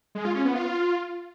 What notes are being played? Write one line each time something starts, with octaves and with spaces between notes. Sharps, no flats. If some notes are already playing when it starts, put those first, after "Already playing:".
G#3
F4
C#4
B3
F4